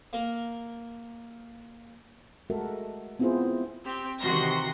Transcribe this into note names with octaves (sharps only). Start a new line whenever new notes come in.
A#3 A#4
G#3 A3 F#4 A4 A#4 E5
B3 C4 E4 F4 G#4 C5
C4 G4
C3 D#3 E3 F#4 C6 A#6